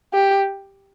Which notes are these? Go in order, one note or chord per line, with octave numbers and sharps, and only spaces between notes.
G4